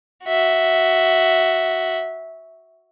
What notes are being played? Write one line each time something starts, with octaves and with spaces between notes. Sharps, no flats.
F#4 E5